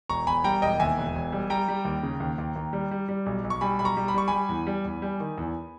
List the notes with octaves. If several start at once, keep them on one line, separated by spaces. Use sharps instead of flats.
E1 A#5 C#6
E1 G#5 B5
G3 G5 A#5
E1 D#5 G5
D#2 E5 G#5
E1
E1
G3
G3 G5 A#5
G3
D#2
C#3
D#2
D#2
D#2
G3
G3
G3
B1
B1
C#6
G3 G#5 B5
B1 B5
A#5 C#6
G3
B5
G3 C#6
G3 G#5 B5
E2
G3
E2
G3
D#3
E2